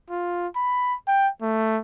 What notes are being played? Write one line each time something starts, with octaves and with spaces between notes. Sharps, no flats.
F4
B5
G5
A3